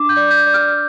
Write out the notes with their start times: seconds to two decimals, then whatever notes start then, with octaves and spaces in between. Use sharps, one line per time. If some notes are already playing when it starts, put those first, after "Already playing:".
Already playing: D4 D6
0.09 G6
0.17 D5
0.31 G6
0.46 D5
0.54 F6